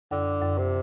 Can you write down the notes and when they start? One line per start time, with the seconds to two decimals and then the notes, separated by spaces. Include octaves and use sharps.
0.11 F#2 D3
0.42 F#2
0.58 C3